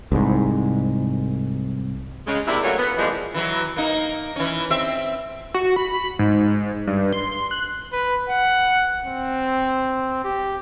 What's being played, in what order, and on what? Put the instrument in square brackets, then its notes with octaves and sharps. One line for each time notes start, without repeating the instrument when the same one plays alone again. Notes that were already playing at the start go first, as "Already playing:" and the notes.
[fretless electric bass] C2 G#2
[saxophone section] C#3 G#3
C3 A#3 D4 E4
F#3 A3 A#3 C#4 F#4
B3
E3 F3 G3 G#3 A#3 C4
[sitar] E3 F#3
A#3 D#4
E3 C#4
C4 E5
[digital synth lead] F#4
B5
G#2
G2
C6
F#6
[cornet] B4
F#5
C4
G4